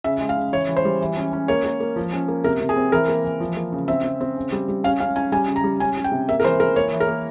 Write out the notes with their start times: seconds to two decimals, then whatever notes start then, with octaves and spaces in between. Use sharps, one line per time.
0.04 C#3 E5
0.20 G#3
0.29 F5
0.37 C#3
0.52 E3 C#5
0.69 E3
0.77 C5
0.85 G3
1.01 E3
1.17 C#4
1.33 C#4
1.48 A#3 C#5
1.64 A#3
1.80 A#3
1.96 F3
2.12 C#4
2.28 A#3
2.44 C3 A#4
2.61 C3
2.69 G#4
2.76 C4
2.92 E3 A#4
3.08 A#3
3.24 E3
3.40 F3
3.56 A#3
3.72 C#3
3.88 C4 E5
4.04 C4
4.21 C4
4.36 C#3
4.52 G3
4.68 G3
4.84 C#4 F5
5.00 C#4 F5
5.16 C#4 G#5
5.32 G3 G#5
5.48 C#3
5.56 A#5
5.64 G3
5.80 C#4 G#5
5.97 C#4
6.04 G5
6.12 C3
6.28 A#3 E5
6.40 A#4
6.44 E3 C5
6.60 E3 A#4
6.76 A#3 C#5
6.92 E3
7.00 A#4
7.08 A#3